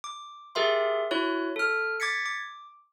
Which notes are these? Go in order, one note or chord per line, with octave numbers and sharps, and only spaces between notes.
D6
G4 G#4 A#4 E5 C6
E4 F#4 C#5 F#6
A4 F6
D6 G#6 A6 B6 C#7
D6